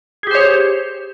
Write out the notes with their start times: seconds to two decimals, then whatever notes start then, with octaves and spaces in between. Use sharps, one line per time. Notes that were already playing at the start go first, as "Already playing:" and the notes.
0.23 G#4
0.27 G4
0.31 C5
0.35 C#5